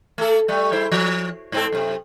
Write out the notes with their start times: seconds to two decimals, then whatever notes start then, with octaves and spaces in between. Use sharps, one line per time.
0.18 A3 A4
0.48 G3 A3
0.72 G3 E4 C5
0.92 F3
1.52 G#2 C4 A4
1.72 F#2 C3